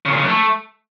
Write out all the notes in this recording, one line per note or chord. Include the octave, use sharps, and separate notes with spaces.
C#3
A#2
C#3
F#2
A3